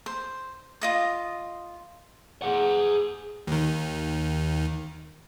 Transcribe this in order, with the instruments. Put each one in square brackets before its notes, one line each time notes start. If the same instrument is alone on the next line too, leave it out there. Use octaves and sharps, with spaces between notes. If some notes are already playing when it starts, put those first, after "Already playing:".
[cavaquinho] C5
F4 D#5 D#6
[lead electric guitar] G#4 F#5
[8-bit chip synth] D#2 D#3